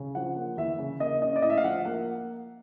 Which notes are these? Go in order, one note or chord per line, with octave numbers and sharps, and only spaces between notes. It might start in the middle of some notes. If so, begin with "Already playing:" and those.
Already playing: C#3
F3 F#5
A#3
E2 E5
C#3
A#3 D#5
C#4 D#5
D5
A2 D#5
E5
F5
F3 F#5
A#3 F#5